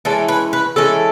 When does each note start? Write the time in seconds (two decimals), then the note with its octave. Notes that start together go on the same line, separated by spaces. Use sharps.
0.05 E3 G#3 C#4 A4
0.28 B4
0.53 B4
0.76 E3 G#3 C#4 A4